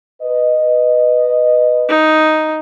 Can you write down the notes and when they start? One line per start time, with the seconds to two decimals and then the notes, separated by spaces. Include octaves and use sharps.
0.22 B4 D#5
1.89 D#4